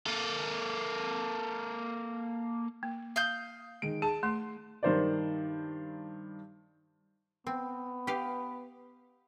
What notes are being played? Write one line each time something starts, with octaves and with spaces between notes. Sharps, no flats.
A#3 A4
A#3
F5 D#6 G6
D#3 G#3 D7
G#4 A5
A3 C6
G2 D#3 C5 D5
B3 C4
G4 B4 F5